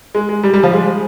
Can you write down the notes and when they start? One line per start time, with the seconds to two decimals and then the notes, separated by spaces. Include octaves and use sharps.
0.15 G#3
0.29 G#3
0.43 G3
0.54 G3
0.63 F3
0.73 G#3